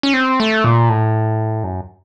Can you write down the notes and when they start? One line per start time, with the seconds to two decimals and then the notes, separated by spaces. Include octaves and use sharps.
0.03 C#4
0.14 C4
0.40 A3
0.64 A#2
0.89 A2
1.64 F#2